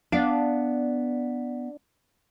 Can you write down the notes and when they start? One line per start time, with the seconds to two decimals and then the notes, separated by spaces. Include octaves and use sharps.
0.12 B3 D4 D5 F5